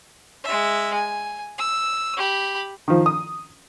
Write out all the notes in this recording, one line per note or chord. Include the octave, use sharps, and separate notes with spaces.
G#3 E5
G#5
E6
G4 B5
D#3 F3
D#6